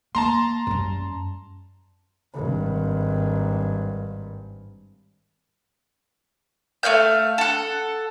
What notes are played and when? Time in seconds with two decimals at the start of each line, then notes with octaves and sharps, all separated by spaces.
0.15 A#3 A5 A#5 C6
0.67 F#2 G3
2.34 G#1 G2
6.83 A3 C4 F5 G6
7.38 A4 F#5